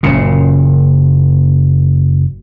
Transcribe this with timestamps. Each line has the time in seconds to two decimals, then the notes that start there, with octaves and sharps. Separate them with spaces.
0.03 F#1 A#2 C#3